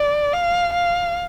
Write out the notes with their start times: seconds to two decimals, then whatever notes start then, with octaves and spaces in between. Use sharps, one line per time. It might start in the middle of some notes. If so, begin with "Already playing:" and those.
Already playing: D5
0.33 F5
0.73 F5